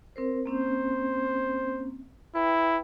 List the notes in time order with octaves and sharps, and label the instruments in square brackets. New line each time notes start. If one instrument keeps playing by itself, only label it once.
[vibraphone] C4 A#4 C5
[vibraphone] A#3 C4 C#4 [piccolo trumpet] C5
[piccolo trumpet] E4 [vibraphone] B4 G5